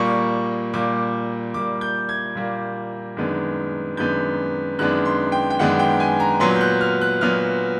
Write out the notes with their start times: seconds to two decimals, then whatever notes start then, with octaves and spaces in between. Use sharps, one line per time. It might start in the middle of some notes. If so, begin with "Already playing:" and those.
Already playing: A#2 G3 A#3 C#6
0.73 A#2 G3 A#3 D6
1.54 A#2 G3 A#3 D6
1.81 G6
2.09 G#6
2.35 A#2 G3 A#3
3.17 F#2 D#3 G#3 B3 D4
3.97 F#2 D#3 G#3 B3 D4 G6
4.79 F#2 D#3 G#3 B3 D4 F#6
5.05 C6
5.32 G5
5.50 G5
5.59 F#2 D#3 G#3 B3 D4 F#5
5.79 G5
6.00 G#5
6.20 A#5
6.40 A#2 F#3 B3 C6
6.55 G6
6.61 F#6
6.81 F6
7.01 F#6
7.21 A#2 F#3 B3 F6